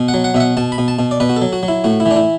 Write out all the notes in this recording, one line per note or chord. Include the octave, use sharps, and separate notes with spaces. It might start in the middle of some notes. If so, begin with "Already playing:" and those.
Already playing: B2
F#5
F#3
F#5
B2 E5
F#5
B2 A5
B5
B2
A5
B2
D5
B2 B4
F#4
A4
F#3
F#4
F#3
E4
A2 F#4
E4
E3
D4
E4